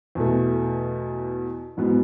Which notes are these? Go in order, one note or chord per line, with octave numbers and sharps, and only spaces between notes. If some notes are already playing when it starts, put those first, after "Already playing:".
E2 B2 A3
A1 G#2 F#3 B3